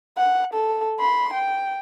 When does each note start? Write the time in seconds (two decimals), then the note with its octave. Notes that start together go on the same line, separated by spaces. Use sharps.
0.18 F#5
0.54 A4
1.00 B5 C6
1.33 G5